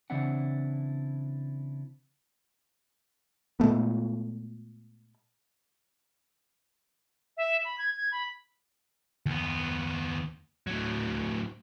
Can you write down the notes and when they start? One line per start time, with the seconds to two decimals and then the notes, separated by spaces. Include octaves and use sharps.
0.10 C#3 E3 C4 D4 E4 F#5
3.60 A#2 G#3 A3 B3
7.37 E5
7.65 B5
7.78 G#6
7.97 G#6
8.12 B5
9.26 D#2 B3
10.67 A2 F#3